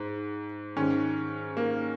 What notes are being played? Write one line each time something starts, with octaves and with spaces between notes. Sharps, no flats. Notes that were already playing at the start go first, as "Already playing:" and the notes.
Already playing: G#2
G#2 D#3 C#4
A#3